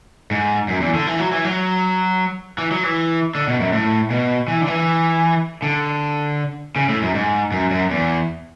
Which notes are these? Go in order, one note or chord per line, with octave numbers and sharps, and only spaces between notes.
G#2
F#2
E2
D3
E3
F#3
E3
F#3
E3
F#3
E3
D3
B2
F#2
A2
B2
E3
D3
E3
D3
C#3
A2
F#2
G#2
F#2
F#2
E2